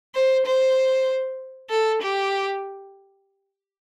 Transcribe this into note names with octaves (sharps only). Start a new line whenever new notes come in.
C5
C5
A4
G4